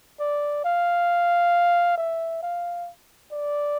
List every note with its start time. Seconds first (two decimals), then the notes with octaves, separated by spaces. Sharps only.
0.19 D5
0.64 F5
1.98 E5
2.42 F5
3.32 D5